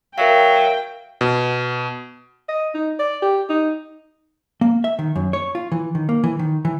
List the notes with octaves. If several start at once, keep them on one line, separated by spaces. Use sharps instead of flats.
F#3 A#4 E5 F5 G5
B2
D#5
D#4
D5
G4
D#4
A#3
E5
D#3
F#2
C#5
F4
E3
D#3
A#3
E3
D#3
E3